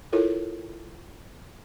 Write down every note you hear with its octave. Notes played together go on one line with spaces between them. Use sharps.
E4 F4 A4 A#4 C#5